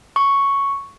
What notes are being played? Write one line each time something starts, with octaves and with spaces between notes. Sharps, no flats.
C#6